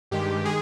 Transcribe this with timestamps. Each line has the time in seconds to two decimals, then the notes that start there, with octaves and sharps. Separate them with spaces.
0.11 G2 D#3 G#3 G4
0.44 D#3 G#3 G#4